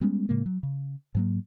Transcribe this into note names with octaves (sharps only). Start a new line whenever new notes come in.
G3 G#3 B3 C#4
A2 C#3 G#3 A#3
F#3
C#3
G#2 F#3 A#3